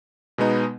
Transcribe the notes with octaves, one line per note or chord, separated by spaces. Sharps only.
B2 G#3 B3 D#4